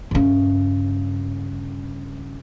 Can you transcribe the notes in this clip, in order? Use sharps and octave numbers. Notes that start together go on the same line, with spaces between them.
G2 C#3